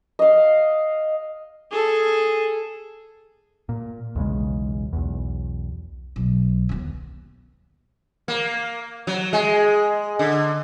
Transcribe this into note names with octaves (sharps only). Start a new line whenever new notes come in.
D#5 F5
G#4 A4
A#2
B1 E2 C#3 G#3
B1 E2
B1
D#2 B3
A#3
F#3
G#3
D3